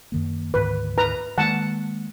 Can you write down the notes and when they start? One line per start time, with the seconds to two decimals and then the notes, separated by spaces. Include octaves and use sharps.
0.12 F#2 D#3 A#3
0.54 D2 G#2 D#3 B4
0.98 B4 A#5
1.38 D#3 G#3 A#3 F#5 A5